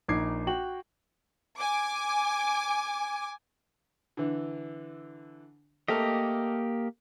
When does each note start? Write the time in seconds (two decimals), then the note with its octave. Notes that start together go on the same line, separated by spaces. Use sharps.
0.08 A#1 D#4 D6 G#6 C7
0.47 F#4 G5 F#7
1.57 G#5 D6
4.17 D3 E3
5.88 A3 A#3 G4 A4 A#4 D#5